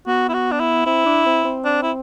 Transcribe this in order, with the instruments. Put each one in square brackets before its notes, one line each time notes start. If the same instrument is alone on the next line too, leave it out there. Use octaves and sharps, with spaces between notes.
[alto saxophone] B3 [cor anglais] F#4
[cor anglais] E4
F#4
D4
E4
[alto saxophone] C4 [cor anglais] E4
[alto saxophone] D4
C4
C4
[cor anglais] D4
E4